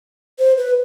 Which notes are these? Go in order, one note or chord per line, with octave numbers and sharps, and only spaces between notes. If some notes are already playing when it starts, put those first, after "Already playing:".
C5
B4